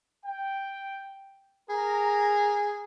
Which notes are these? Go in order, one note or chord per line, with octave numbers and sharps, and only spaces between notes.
G5
G#4 A#4 A#5